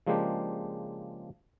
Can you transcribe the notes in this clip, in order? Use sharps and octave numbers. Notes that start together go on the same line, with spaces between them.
C#3 F3 G#3 A#3 D4 G4